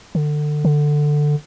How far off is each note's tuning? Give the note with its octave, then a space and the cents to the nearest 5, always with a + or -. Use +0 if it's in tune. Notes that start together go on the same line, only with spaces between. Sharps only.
D3 +25
D3 +10